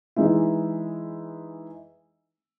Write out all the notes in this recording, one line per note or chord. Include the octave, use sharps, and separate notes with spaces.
E3 G#3 D#4 E4